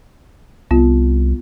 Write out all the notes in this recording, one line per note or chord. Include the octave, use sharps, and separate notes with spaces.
C2 B3 F4